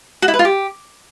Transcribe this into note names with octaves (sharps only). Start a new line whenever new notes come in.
F#4
E4
B4
F4
G4